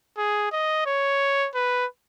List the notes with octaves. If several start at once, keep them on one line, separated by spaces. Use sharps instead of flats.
G#4
D#5
C#5
B4